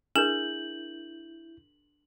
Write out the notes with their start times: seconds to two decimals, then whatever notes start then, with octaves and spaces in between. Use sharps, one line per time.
0.16 D4 E4 G#4 A#4 G6 F#7